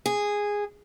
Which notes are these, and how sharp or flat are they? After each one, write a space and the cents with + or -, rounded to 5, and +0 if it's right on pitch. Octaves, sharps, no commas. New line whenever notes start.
G#4 -10